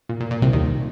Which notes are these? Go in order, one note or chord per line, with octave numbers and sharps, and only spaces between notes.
A#2
A#2
A#2
C2 C3
D#2 D#3